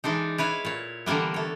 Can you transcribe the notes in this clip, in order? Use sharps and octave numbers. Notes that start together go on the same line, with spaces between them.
E3 G#3 D4 D#4
E4 B4 C#5 F5
A#2 C#5
D3 E3 G3 A#3 B3
A3 C#5